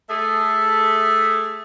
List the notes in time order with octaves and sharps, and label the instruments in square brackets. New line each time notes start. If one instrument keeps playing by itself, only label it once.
[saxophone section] A3 G#4 A4 E5